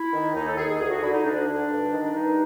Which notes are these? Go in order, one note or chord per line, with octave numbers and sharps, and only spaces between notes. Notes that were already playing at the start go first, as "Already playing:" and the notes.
Already playing: E4
D#3
D#2 D#4
A4
D#3 G#4
G#4
D2 G#4
F#4
D3 E4
D#4
D2 D4
D3
G2
D#3
D4
G2 D#4